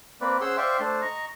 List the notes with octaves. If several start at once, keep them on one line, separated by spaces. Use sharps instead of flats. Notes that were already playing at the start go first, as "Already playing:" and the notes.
A#3 C4 B4 D5
C#4 G#4 C5 F#5 C6 E6
C5 D5 E5 F5 G5 C#6
A3 D4 C5 A5
D#5 A#5 C#6